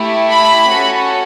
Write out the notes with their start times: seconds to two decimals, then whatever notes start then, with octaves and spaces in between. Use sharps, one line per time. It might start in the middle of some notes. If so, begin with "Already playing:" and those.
Already playing: A3 E4 G4
0.30 B5
0.70 C#4 F#4 A4